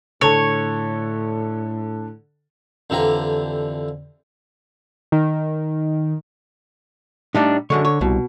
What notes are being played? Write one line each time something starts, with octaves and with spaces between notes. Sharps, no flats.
A2 D3 A4 C#5
F2 D3 E3 G4 A#5
D#3
A2 G3 D4 D#4
F#2 D3 G#3 C#5
C#5
C2 B2